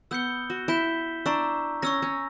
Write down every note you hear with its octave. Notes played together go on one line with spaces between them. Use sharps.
B3 E6 G6 C#7 G7
F#4
E4 G6 B6 E7 G7
D4 A#5 C#6 E6
C#4 C#6 E6 A#6
C#4